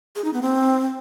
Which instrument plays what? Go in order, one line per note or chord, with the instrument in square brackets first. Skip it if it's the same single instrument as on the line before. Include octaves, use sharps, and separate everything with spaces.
[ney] G#4
D#4
B3
C4